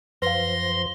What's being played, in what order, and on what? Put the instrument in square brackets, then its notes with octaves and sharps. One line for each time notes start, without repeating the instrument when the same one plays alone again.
[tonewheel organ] F#2 F3 C5 [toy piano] B4 F5 [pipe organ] C6 [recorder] A#6